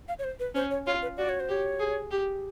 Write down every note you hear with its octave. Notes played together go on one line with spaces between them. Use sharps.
F5
C#5
C5
B4
C#4 C5
C#5
F4 C#5
B4
F#4 D5
C#5
C5
G4 C#5
G#4
G4